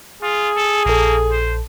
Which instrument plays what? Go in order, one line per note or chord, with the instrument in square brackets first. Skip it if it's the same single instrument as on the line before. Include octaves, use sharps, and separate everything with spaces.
[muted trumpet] F4 [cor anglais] G#4
[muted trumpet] A4
[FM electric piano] A#1 A4 [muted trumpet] A#3
[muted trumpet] C5